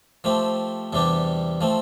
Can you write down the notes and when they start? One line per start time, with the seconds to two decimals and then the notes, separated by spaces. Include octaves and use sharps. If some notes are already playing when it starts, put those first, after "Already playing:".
0.24 F3 A3 C4 G4
0.93 E2 C3 G3 D4 G4
1.61 F3 A3 C4